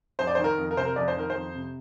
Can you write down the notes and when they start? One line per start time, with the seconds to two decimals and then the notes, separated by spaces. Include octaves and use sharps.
0.19 F2 C5
0.27 D5
0.35 C5
0.38 D#3
0.44 A#4
0.58 F2
0.71 A#4
0.76 C3 C5
0.85 A#4
0.96 F2 D5
1.08 C5
1.16 D#3 A#4
1.30 C5
1.35 F2
1.55 C3